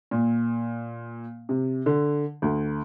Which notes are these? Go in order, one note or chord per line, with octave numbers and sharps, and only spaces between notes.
A#2
C3
D3
D2